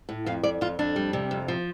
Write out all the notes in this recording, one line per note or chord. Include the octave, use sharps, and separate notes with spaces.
A2
F2 F5
F2 D5
F2 F4
F2 D4
G3
C3
F2
F3